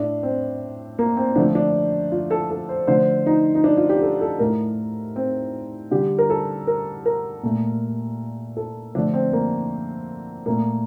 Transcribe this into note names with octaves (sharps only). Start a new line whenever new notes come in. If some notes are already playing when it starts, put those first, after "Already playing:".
Already playing: A2 A3 D4
C4
A#3
C4
D3 F3 A3 D4
D4
F4
A4
A4
C5
D3 F3 A3 C5
D#4
D#4
D4
F4
G4
A4
A4
A2 A3 A#4
C4
D3 G3 G4
A#4
A4
A#4
A#4
A#2 A3
A4
D3 F3 A3 D4
C4
A#3
A#2 A3 A#3